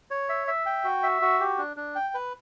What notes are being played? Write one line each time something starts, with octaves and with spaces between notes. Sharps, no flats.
C#5
E5
E5
G5
F#4
E5
F#4
G4
D4
D4
G5
B4